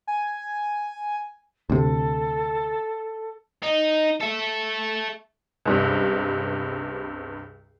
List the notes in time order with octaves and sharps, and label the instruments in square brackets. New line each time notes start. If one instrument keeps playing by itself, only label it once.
[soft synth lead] G#5
[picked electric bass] D2 C3 [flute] A4
[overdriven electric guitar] D#4
A4 E5
[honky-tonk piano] C#2 G2 C3